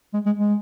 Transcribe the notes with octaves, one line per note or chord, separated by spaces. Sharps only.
G#3
G#3
G#3